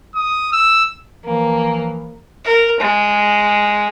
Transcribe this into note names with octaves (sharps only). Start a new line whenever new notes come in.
D#6
E6
E3 F3 A#3
A#4
G#3